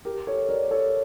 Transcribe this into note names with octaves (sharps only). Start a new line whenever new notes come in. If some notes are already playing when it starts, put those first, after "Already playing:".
G4 A#4
A4 C#5
A#4 D5
A4 C#5